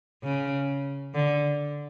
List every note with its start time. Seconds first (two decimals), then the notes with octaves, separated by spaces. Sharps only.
0.23 C#3
1.15 D3